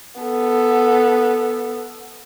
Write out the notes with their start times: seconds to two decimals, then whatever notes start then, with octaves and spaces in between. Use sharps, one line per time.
0.21 B3 A4